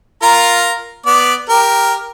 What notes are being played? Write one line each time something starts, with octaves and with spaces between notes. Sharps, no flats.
F4 A#4 A#5
B3 D5
G4 A#4